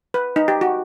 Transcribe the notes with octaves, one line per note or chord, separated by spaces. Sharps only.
B4
D#4
G4
F#4